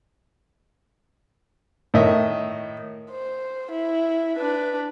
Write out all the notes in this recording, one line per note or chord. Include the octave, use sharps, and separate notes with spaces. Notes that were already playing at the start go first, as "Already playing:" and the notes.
A2 D#3 D#5 E5
C5
E4
D4 B4